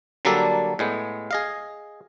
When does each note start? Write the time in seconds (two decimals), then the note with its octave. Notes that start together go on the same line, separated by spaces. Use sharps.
0.25 D3 F#3 G3 A#3 D4 A4
0.79 A2 G#3 B3
1.31 G#4 D#5 F5